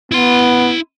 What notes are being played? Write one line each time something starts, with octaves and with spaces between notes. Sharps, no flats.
B3 E4 C6